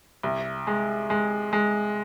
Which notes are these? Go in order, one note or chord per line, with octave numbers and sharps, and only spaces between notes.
C2
G#3
G#3
G#3